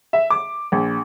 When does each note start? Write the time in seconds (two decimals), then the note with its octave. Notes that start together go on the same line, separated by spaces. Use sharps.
0.13 E5
0.30 D6
0.72 A#1